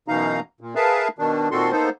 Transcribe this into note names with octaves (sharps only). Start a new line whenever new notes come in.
F#2 B2 E3 D#4 F5 A#5
A#2
G#4 A#4 B4 E5 F5 A5
B2 D#3 D4
A#2 D#3 C4 F#4 A4 C6
A#3 B3 D#4 A4 C5